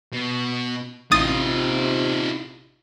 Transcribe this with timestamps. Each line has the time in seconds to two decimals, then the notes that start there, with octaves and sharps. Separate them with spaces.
0.13 B2
1.11 A1 C3 D#4 F4 D#6 A6